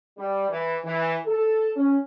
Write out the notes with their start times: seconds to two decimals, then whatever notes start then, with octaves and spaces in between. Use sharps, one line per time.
0.18 G3
0.50 E3
0.84 E3
1.27 A4
1.76 C#4